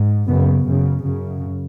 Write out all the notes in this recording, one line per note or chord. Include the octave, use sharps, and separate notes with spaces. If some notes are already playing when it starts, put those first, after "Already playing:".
Already playing: G#2
F#2 C#3 B3
F#2 C#3
F#2 C#3